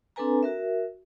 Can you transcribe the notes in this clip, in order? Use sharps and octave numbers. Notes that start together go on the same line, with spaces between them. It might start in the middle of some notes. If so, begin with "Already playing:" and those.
C4 D4 A4 B4 G#5 A#5
F#4 A#4 E5